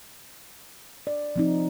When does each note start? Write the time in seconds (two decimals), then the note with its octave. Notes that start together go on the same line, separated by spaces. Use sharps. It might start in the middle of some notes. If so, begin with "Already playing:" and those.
1.07 D5
1.36 F3 C4 D#4